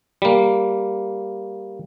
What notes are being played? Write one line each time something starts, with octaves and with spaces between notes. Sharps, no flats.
G3 A#3